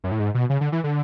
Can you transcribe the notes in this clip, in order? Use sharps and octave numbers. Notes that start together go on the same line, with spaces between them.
F#2
A2
G#2
B2
C#3
D3
E3
D3